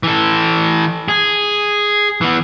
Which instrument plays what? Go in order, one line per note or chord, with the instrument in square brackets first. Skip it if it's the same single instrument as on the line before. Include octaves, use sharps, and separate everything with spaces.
[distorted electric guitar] E3 A4
G#4
E3 B3